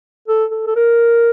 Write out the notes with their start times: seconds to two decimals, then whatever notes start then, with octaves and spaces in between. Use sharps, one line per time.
0.28 A4
0.51 A4
0.67 A4
0.76 A#4